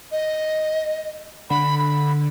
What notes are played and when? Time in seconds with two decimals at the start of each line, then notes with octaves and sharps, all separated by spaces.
0.12 D#5
1.50 D3 B5
1.79 B5